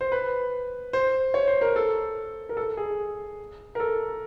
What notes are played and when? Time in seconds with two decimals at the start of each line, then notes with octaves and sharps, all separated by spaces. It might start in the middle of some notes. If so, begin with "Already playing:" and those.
0.01 C5
0.12 B4
0.93 C5
1.34 C#5
1.48 C5
1.61 A#4
1.76 A4
2.49 A#4
2.57 A4
2.77 G#4
3.75 A#4
3.80 A4